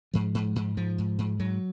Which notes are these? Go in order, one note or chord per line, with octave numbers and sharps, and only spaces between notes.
G#2 F3
G#2
G#2
G#2 F3
G#2
G#2
G#2 F#3